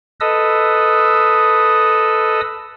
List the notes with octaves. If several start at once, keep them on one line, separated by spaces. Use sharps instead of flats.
A4 B4 D#5 D#6 E6